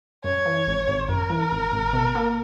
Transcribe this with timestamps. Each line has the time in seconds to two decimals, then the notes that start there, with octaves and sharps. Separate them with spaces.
0.24 F#2 C#5
0.45 E3
0.67 G#1
0.88 G#1
1.09 F#2 A#4
1.30 E3
1.51 G#1
1.72 G#1
1.93 B2
2.15 A#3